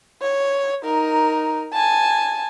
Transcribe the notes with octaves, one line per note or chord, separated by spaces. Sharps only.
C#5
D#4 A#4
G#5 A5